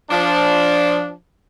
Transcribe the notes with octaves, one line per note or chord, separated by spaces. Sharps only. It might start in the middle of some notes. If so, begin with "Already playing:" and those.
F3 D4